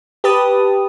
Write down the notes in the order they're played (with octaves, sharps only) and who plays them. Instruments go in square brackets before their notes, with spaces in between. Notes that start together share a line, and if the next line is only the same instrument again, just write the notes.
[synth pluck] G4 B4 A5 D#6